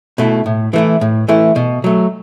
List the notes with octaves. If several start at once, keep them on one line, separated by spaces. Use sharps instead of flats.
B2 A3 E4
A2
E3 A3 E4
A2
E3 A3 E4
B2
F#3 A3